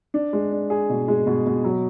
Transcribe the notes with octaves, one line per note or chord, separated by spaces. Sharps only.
D4
G#3
D4
G#4
B2
G#3
B2
B2
F#3